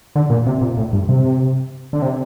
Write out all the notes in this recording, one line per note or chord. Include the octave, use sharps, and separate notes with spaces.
D3
A#2
C3
A#2
A2
G2
C3
D3
C3